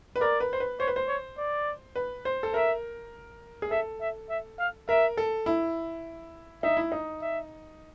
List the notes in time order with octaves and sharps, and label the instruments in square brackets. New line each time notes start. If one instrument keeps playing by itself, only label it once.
[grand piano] B4
[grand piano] A#4 [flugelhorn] D5
[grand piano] B4
C5
B4
[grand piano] C5 [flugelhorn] C#5
[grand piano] B4
C5
[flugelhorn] C#5
D5
[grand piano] B4
C5
A4
[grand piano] A#4 [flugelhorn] E5
[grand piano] G#4
[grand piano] A4 [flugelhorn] E5
[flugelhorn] E5
E5
F5
[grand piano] A#4 [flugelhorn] E5
[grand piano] A4
E4
[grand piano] D#4 [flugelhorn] E5
[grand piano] E4
D#4
[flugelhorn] E5